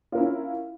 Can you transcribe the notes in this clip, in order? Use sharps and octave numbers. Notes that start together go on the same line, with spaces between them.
C#4 E4 F4 A#4